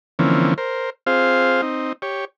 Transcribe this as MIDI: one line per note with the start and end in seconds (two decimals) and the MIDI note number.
0.19 0.54 50
0.19 0.54 52
0.19 0.54 53
0.19 0.54 58
0.19 0.54 60
0.19 0.54 61
0.58 0.90 70
0.58 0.90 72
1.07 1.62 60
1.07 1.62 65
1.07 1.62 68
1.07 1.62 72
1.07 1.62 77
1.62 1.93 60
1.62 1.93 63
2.02 2.25 67
2.02 2.25 73